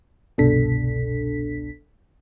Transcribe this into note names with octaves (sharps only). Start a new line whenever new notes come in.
G1 C2 B2 D4 A4 B6